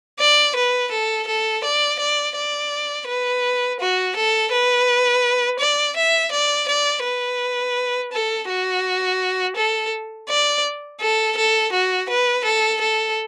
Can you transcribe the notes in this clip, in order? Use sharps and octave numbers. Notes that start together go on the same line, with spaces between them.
D5
B4
A4
A4
D5
D5
D5
B4
F#4
A4
B4
D5
E5
D5
D5
B4
A4
F#4
A4
D5
A4
A4
F#4
B4
A4
A4